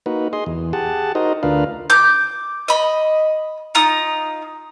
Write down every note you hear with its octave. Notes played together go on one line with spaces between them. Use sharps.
A#3 D#4 F#4 B4
G#4 D#5 C6
E2
G4 G#4 F#5 A5
D#4 F#4 A#4 C5 D#5
D2 D4 F4 A#4 B4 F5
D6 G6
D#5 B5
D#4 F4 D#6